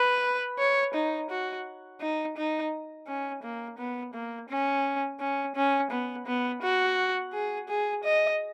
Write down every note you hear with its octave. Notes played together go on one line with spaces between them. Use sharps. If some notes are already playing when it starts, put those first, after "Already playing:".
Already playing: B4
C#5
D#4
F#4
D#4
D#4
C#4
A#3
B3
A#3
C#4
C#4
C#4
B3
B3
F#4
G#4
G#4
D#5